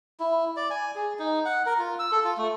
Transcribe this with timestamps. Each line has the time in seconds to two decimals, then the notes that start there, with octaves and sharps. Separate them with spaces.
0.20 E4
0.56 D5
0.70 G#5
0.95 G#4
1.19 D#4
1.45 F#5
1.66 A#4
1.79 F4
1.99 E6
2.12 A4
2.24 F4
2.37 A3